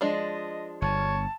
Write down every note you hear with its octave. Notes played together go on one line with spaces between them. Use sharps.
F3 G#3 D4 D#5
G1 C#5 A5